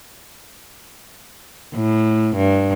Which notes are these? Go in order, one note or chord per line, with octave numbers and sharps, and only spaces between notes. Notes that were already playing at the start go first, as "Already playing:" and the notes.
A2
G2